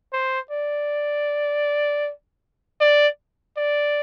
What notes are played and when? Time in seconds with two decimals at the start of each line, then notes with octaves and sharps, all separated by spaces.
0.13 C5
0.51 D5
2.81 D5
3.57 D5